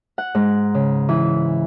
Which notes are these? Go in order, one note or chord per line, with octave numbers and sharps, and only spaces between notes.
F#5
G#2
C#3
E3